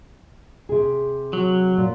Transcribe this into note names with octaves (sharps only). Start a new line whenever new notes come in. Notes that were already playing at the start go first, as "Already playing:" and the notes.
C3 G#4
F#3
A#2